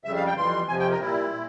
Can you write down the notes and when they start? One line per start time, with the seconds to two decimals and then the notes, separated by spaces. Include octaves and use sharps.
0.04 F2 C#3 G3 E5
0.16 F5
0.26 G5
0.37 F2 E3 G3 C6
0.68 F2 C3 F3 G#5
0.80 G5
0.91 A#4
1.01 A#2 G3 E4
1.33 A#2